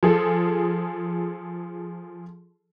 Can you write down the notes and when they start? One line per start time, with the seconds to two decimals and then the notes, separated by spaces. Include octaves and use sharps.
0.03 F3 G#4 A4